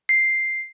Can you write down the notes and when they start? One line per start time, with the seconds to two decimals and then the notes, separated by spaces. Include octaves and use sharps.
0.09 C7